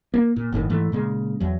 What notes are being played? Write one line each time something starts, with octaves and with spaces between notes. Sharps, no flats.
A#3
A#2
G1 A2 D3 D#3
G#2 E3 A3
A#2 C#3 G#3
E2 F#3